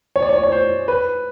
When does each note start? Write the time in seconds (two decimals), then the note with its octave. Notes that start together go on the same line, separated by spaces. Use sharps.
0.16 C#5
0.22 D5
0.29 C#5
0.37 D5
0.43 C#5
0.52 C5
0.88 B4